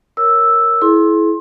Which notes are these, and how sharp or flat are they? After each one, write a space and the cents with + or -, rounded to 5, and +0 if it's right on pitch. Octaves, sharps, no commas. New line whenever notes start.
A#4 +0 C#5 +0 E6 +0
E4 +0 G#4 +45 C6 +20